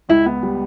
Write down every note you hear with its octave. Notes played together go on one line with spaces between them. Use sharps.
C#2 E4
B3
G3